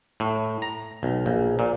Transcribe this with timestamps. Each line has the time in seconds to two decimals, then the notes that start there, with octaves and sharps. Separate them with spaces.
0.20 A2
0.62 A#5
1.03 B1
1.26 A#1
1.59 A#2